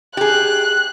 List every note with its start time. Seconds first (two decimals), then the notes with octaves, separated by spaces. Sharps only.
0.17 G4 G#4 F#6